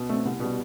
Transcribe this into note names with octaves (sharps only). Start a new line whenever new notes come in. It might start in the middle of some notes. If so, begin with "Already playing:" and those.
Already playing: B2
A3 C4
C2
B2 G3